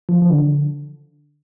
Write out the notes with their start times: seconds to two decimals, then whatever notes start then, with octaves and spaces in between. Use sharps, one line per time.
0.09 F3
0.22 F3
0.30 D3